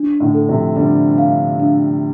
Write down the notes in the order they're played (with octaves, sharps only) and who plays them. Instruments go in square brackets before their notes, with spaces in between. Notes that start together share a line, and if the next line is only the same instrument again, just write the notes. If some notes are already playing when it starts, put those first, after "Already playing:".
Already playing: [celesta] D4
[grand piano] A2 D3
[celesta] A4
[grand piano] C3 F3
[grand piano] D3 G3 [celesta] D4
[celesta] F5
D4